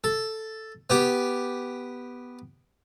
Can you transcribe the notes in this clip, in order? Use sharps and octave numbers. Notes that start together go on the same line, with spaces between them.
A4
B3 G4